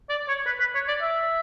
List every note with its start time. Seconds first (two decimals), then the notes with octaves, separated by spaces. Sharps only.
0.09 D5
0.28 C#5
0.46 B4
0.60 B4
0.75 C#5
0.88 D5
1.02 E5